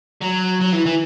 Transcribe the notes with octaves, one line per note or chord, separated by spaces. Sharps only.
F#3
F#3
E3
E3